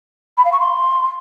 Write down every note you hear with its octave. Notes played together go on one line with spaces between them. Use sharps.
B5
F5
C#6
C6